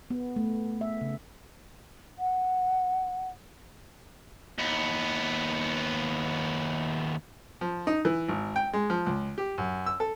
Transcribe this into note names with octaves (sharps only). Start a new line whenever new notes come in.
B3
A3
E5
C#3
F#5
D#2 B3
F3
D#4
E3
G#1
G5
G#3
F3
C#2
G4
F#2
E6
A4